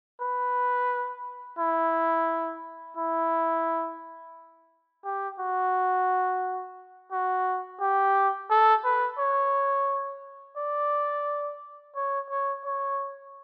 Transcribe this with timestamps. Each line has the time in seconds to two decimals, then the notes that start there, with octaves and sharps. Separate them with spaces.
0.21 B4
1.59 E4
2.97 E4
5.05 G4
5.40 F#4
7.12 F#4
7.80 G4
8.50 A4
8.84 B4
9.19 C#5
10.57 D5
11.96 C#5
12.30 C#5
12.65 C#5